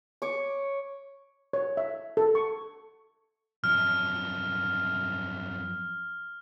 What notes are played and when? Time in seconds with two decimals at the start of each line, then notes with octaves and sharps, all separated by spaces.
0.22 C#5 D6
1.53 C#5
1.77 E5
2.17 A4
2.35 C#6
3.64 F#2 F3 F6